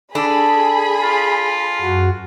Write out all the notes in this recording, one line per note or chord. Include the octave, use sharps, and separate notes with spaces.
D4 G#4 A4 B5
F4
F#2 F#4